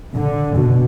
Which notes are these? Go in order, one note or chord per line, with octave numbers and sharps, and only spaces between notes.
D3
B2